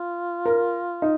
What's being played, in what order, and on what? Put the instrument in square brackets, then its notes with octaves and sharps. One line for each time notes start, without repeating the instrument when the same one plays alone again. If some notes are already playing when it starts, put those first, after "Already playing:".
Already playing: [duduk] F4
[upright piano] A#4
D#4